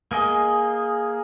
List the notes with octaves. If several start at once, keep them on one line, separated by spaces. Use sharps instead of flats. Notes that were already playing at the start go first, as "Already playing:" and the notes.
A#3 G#4 D#5